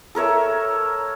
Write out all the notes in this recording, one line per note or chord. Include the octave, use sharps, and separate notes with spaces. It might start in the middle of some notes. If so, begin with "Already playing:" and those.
A4 A#4 C#5 E5